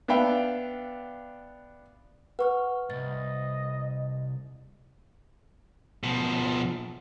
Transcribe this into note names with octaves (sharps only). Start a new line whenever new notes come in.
B3 D4 E5 F5 G5
B4 F#5 C#6 F6
C2 G#2 D#5 A6
B2 F3